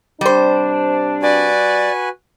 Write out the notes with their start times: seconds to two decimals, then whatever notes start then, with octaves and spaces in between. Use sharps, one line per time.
0.21 C3 G3 D4 C5
1.22 F#4 B4 D5 G#5